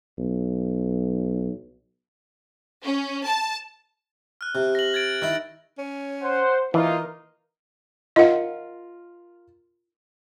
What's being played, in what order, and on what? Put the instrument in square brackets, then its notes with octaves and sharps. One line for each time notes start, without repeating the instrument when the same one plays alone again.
[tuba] B1
[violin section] C#4
A5
[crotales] F6 F#6
[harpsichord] C3
[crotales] A#6 F#7
G#6 A6 D7
[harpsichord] D#3 E4
[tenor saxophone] C#4
[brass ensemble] C5 [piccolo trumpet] F#5
[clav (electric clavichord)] E3 [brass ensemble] A#3 D#4 F4 [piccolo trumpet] A#4 [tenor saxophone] D#5
[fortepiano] F4 A#4 [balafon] D#5 F#5